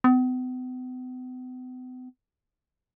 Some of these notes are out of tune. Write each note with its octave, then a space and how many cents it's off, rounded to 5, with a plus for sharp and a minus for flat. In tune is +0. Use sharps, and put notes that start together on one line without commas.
B3 +45